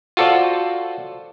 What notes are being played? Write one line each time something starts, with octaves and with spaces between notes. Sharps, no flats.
F4 F#4 A4 C5 D5